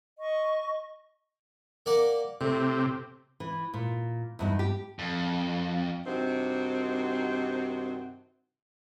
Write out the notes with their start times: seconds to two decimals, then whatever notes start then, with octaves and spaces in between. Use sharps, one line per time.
0.19 D#5 C#6
1.86 A#3 D5 F#5
2.41 A2 C3
3.40 E3
3.74 A#2
4.39 E2 G2 D#4
4.59 G4
4.99 F2
6.06 G2 C3 D#3 C4 D#4 F#4